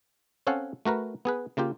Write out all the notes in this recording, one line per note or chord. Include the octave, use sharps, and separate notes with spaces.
C4 C#4 A4 C#5 F5 F#5
A3 F#4 A#4 B4
B3 G#4 B4
C#3 A#3 F4 G4